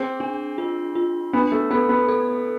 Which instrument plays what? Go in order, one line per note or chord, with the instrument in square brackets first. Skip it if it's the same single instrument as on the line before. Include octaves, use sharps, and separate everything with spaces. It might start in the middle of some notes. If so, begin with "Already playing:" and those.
Already playing: [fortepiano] C4 [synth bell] G#4
[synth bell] D4
F4
F4
[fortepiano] B3 [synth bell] D4
[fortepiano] A3
[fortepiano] B3 [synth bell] A4
[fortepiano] B3
[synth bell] A4